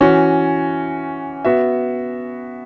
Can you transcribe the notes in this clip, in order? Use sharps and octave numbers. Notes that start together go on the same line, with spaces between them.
E3 C#4 F#4
B3 F#4 E5